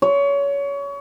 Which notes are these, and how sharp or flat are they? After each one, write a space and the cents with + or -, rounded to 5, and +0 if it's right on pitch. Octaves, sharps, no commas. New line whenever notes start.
C#5 +25